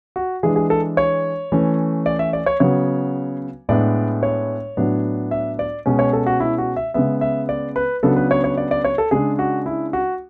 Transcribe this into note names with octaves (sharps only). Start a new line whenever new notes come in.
F#4
E3 G#3 D4 G#4
G#4
A4
C#5
E3 A3 C#4
D5
E5
D5
C#5
C#3 F#3 B3 C#5
A2 G#3 B3 D4 D5
C#5
A2 F#3 B3 D4
E5
D5
B2 G#3 C#4
C#5
A4
F#4
E4
F#4
E5
C#3 G#3 B3 E5
E5
D5
B4
C#3 F#3 B3 D4 A4
B4
C#5
C#5
D5
D5
C#5
A4
C#3 G#3 D4 G#4
F#4
E4
F#4